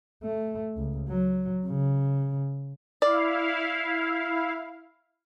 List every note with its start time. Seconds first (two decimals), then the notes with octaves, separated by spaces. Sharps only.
0.23 A3
0.77 C#2
1.08 F#3
1.66 C#3
3.02 E4 D5 F5